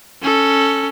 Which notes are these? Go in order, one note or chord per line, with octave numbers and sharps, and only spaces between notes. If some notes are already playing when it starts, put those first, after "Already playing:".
C#4 A4